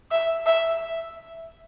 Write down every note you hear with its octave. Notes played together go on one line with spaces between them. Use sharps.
E5
E5